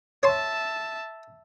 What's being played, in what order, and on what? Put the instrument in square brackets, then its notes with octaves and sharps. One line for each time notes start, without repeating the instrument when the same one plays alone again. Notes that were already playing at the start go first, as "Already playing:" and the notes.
[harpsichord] C#5 C6 [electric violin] E5 A5